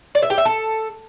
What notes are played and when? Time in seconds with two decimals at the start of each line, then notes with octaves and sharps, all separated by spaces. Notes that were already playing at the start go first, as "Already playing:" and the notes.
0.15 D5
0.22 E5
0.30 G4
0.38 E5
0.45 A4